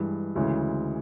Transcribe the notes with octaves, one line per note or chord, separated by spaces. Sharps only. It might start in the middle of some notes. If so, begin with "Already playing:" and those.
Already playing: G2 E3 G#3
D2 C#3 E3 G#3